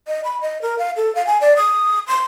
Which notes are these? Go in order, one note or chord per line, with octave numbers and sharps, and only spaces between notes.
D#5
B5
D#5
A#4
F5
A4
F5
G#5
D5
D#6
C6